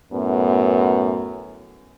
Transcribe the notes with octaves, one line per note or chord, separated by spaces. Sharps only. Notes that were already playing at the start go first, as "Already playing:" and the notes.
F#2 A2 B3